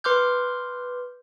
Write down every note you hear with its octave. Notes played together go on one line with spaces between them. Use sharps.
B4 C6 D6 F6 G6